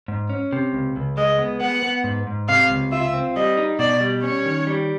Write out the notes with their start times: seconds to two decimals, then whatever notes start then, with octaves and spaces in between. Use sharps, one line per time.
0.08 G#2
0.30 C#4
0.53 C3
0.73 C#2
0.96 C#2
1.17 G#3 D#5
1.39 B3
1.61 B3 F#5
1.83 B3
2.04 G#2
2.27 G#2
2.49 C3 F5
2.70 C#2
2.92 F4 E5
3.14 C4
3.36 G3 D#5
3.57 D#4
3.79 B2 D5
4.01 G3
4.23 C#4 C#5
4.45 D#3
4.67 G3